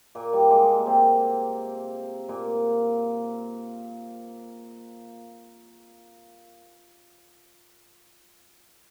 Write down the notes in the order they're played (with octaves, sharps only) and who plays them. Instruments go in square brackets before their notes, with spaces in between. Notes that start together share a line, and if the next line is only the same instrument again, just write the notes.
[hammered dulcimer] A#2 A#3
G3
G#3
A#2 A#3
C3 C4
A#2 A#3